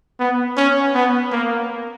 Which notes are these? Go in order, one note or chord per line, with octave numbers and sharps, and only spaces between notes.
B3
C#4
B3
A#3